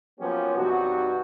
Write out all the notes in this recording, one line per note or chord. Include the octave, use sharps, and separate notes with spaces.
F3 F#3 A#3 B3 C#4 G4
G2 C3 D#4 F#4